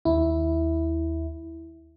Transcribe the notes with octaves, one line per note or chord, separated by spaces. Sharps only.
D#2 E4